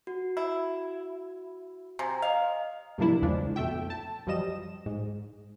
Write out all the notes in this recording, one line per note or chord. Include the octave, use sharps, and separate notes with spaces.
F#4
E4
C3 G#5 A#5
D#5 F5
G2 C3 F3 A#3 D4 E4
E2 C#3 F3 G#3 D4
F2 B2 A3 E5 G5
A5
F#2 F3 G3 D#5 E7
G#2